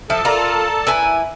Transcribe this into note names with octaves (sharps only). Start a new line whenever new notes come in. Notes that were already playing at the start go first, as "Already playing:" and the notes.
F3 A4 E5 A5
F4 A#4 D5 A#5
E4 B4 G#5